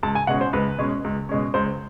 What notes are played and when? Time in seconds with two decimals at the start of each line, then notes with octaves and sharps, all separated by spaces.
0.03 C#2 A5
0.15 G#5
0.27 B2 G#3 C#4 F#5
0.41 C5
0.53 C#2 B4
0.78 B2 G#3 C#4
1.04 C#2
1.29 B2 G#3 C#4
1.54 C#2 C5